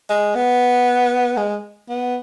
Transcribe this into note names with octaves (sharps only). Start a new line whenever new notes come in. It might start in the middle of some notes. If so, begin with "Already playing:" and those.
G#3
B3
G#3
B3